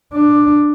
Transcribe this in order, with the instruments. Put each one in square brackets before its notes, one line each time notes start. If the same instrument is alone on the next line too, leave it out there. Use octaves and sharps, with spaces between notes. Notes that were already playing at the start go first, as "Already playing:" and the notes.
[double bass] D4